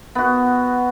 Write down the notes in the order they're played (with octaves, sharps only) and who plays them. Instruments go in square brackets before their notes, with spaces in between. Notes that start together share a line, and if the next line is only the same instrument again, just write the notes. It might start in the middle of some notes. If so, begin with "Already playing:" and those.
[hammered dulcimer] B3 F#4